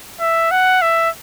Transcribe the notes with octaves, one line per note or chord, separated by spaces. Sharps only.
E5
F#5
E5